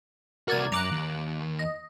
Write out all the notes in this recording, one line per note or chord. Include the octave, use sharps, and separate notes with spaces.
C2 F#4 A#4 D5 G#6
F#2 A#5 D6 F#6
D#2
D#5